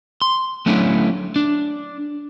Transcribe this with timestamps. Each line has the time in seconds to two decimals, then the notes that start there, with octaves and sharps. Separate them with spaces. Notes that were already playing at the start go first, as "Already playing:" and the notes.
0.22 C6
0.66 F#3 A3 C#4 D4 E4
1.36 D4